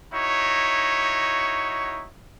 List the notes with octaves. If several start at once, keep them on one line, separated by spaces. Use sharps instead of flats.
D#4 E4 F#4 C#5